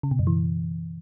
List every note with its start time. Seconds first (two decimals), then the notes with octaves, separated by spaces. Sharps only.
0.03 C#3
0.11 B2
0.19 F#2
0.27 E3